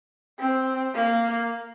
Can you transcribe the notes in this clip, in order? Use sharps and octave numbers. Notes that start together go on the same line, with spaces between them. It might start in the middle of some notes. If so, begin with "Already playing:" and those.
C4
A#3